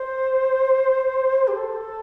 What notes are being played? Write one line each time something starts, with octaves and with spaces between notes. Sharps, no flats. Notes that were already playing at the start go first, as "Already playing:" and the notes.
Already playing: C5
G4
A4